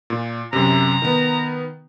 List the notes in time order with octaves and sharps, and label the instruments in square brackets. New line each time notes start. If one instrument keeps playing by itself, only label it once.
[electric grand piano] A#2
[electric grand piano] F#2 C3 [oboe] A#5
[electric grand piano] D#3 B3